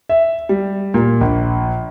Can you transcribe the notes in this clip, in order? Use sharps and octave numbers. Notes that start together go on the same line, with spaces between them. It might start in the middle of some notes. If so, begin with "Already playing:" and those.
E5
G3
A#2
A#1